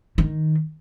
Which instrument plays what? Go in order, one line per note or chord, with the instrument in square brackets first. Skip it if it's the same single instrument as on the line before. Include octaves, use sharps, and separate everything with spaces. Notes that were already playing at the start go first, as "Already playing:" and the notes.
[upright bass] D#3